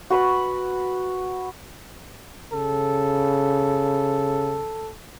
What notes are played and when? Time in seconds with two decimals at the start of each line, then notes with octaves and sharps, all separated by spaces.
0.10 F#4 B4 B5
2.53 C#3 A4